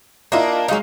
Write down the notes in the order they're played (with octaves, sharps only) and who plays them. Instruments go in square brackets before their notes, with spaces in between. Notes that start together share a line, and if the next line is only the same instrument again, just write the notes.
[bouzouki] A#3 D4 [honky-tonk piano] E4 F4 D#5
[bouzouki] F#3 A#3 D#4 [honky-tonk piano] G#3 F5